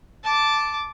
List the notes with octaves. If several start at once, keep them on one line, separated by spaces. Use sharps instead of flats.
A5 D6